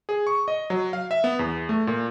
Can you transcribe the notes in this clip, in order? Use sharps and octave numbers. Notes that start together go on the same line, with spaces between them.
G#4
C#6
D#5
F#3
F5
E5
B3
E2
A3
A#2